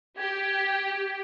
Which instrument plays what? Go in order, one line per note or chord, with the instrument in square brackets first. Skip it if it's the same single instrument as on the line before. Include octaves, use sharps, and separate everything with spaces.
[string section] G4 [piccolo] G#6